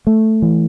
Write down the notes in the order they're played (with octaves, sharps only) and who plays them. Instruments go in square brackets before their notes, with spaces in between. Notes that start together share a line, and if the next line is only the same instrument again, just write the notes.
[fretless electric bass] A3
E3